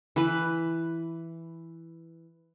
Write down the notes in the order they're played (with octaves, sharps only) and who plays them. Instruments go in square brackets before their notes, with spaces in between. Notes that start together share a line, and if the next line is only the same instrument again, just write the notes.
[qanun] E3 B4